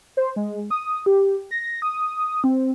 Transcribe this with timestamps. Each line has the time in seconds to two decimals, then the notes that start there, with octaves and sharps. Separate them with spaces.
0.17 C5
0.36 G#3
0.70 D#6
1.06 G4
1.51 A#6
1.82 D#6
2.44 C4